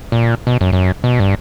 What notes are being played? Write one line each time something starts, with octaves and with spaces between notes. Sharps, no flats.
A#2
B2
F#2
F#2
B2
G2